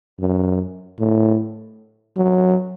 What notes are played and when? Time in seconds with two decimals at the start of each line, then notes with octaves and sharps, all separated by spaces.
0.20 F#2
0.99 A2
2.17 F#3